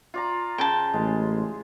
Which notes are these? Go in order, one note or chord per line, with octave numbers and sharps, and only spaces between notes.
F4 D5 A#5
C#3 G5 A5
A1 G#3